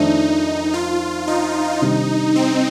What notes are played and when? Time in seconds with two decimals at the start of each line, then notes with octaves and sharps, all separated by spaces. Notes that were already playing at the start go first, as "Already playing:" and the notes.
Already playing: F2 D#3 A3 D4 D#4
0.73 F4
1.27 D#4
1.81 C3 D#3 G3 D4
2.36 C4